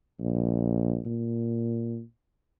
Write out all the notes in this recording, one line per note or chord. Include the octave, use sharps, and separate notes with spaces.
A#1
A#2